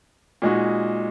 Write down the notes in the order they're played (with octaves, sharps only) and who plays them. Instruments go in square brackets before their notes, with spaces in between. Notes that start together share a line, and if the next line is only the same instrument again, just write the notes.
[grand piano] A#2 G#3 D#4 F#4